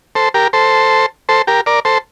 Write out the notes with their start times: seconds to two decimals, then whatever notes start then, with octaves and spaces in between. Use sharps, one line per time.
0.15 A4 C5
0.34 G4 A#4
0.53 A4 C5
1.29 A4 C5
1.47 G4 A#4
1.66 A#4 D5
1.85 A4 C5